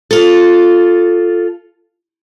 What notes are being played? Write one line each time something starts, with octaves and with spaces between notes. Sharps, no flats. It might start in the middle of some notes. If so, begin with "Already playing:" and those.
F4 A4